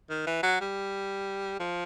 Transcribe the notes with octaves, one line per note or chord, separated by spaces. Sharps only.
D#3
E3
F#3
G3
F3